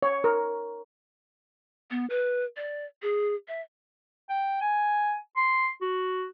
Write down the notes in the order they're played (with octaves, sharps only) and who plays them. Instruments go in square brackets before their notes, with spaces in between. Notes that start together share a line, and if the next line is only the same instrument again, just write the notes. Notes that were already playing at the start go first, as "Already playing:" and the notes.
[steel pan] C#5
A#4
[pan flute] B3
B4
D5
G#4
E5
[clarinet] G5
G#5
C6
F#4